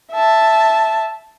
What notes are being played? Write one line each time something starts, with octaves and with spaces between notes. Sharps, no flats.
E5 A5